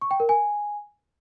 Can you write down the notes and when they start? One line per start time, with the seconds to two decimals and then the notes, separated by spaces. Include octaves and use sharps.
0.01 C#6
0.11 G5
0.20 A#4
0.29 G#5